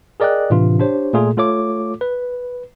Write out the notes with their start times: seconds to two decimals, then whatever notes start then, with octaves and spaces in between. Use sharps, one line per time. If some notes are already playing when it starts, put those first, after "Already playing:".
0.20 G#4 A#4 D5 D#5 G5 F#6
0.50 A2 C3 E3 D4 F4
0.79 D4 G4 C5 C#5
1.13 A#2 A3 F4 G#4 A4
1.37 A3 F4 A4 C#5 D6
2.01 B4